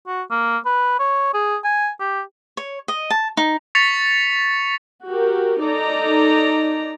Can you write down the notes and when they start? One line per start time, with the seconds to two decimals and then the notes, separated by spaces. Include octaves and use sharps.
0.07 F#4
0.31 A#3
0.65 B4
0.99 C#5
1.34 G#4
1.64 G#5
2.00 G4
2.57 C#5
2.88 D#5
3.10 A5
3.37 D#4
3.75 C#6 A6 B6 C#7 F7
5.08 F#4 G4 A#4
5.63 D#4 A4 D5 A#5